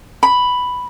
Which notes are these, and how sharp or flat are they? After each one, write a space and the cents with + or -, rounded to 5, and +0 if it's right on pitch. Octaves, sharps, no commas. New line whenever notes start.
B5 +5